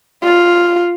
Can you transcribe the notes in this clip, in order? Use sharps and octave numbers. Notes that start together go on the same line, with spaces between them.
F4